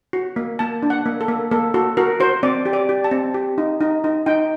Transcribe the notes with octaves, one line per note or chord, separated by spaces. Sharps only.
F#4
A#3
A#3 A5
D4
F#5
A#3
A4
A#3
A#3 A4
F#4 A4
F#4 A#4
F#4 C5
C4 D5
G4
D5
G4
A5
C4
G4
D#4
D#4
D#4
D#4 G5